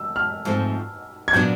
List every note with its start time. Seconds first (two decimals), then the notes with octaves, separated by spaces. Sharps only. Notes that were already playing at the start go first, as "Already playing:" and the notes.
Already playing: E6
0.16 F6
0.45 G#2 F3 A3 C4
1.28 G#6
1.33 A#2 F#3 B3 D4 G6